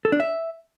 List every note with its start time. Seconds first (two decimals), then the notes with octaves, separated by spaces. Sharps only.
0.05 A4
0.12 D4
0.20 E5